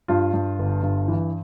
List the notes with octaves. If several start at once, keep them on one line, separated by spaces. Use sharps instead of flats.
G2 F4
G2
G1
G2
E3